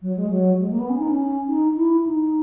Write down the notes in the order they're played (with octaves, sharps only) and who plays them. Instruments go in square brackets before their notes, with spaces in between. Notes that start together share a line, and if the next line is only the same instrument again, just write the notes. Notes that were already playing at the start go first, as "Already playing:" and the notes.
[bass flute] F#3
G#3
F#3
G#3
A#3
B3
C#4
D#4
C#4
D#4
E4
D#4